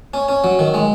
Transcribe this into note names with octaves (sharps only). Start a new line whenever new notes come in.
C#4
C#4
F#3
D#3
G#3